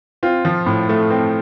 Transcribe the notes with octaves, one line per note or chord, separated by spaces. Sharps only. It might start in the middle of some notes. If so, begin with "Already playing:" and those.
C4 F4
F3
A2
A3
C4